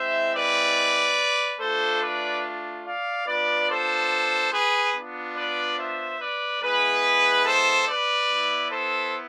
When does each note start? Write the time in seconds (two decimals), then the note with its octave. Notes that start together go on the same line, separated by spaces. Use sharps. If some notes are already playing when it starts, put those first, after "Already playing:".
Already playing: G#3 C4 E4 C5 E5
0.34 B4 D5
1.60 A3 D4 F4 A4 C5
2.01 B4 D5
2.85 D5 F5
3.27 B3 D4 F4 B4 D5
3.69 A4 C5
4.53 G#4 B4
4.94 B3 D4 F4
5.36 B4 D5
5.78 C5 E5
6.20 B4 D5
6.61 G#3 B3 E4 G#4 B4
7.45 A4 C5
7.87 B4 D5
8.29 B3 E4
8.71 A4 C5